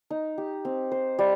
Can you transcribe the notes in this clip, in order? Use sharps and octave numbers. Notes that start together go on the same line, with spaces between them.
D#4
G4
C4
C5
G3